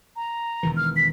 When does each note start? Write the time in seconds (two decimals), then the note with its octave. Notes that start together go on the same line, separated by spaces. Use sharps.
0.16 A#5
0.63 E1 D#3 E3
0.76 F6
0.96 B6